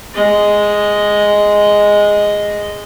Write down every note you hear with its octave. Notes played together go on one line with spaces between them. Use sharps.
G#3 D#5